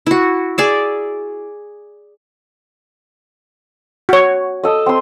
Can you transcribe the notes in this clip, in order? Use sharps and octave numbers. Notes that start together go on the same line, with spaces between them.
E4 F#4
G#4 D5 E5
F#4 C#5
A4 D#5
C4 C6